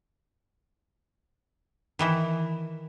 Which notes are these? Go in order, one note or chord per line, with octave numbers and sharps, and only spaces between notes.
D#3 E3 E4